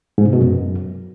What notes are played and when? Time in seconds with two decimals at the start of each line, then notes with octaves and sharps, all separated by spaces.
0.18 G#2
0.25 C3
0.33 B2
0.40 F#2